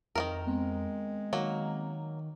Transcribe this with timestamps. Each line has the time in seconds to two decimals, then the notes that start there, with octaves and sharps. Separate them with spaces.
0.15 F2 D#3 A#3 A#4
0.47 G#3 B3 C4
1.33 D#3 F#3 A#3